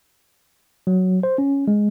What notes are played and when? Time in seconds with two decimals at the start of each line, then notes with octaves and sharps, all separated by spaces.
0.87 F#3
1.23 C5
1.38 C#4
1.68 G#3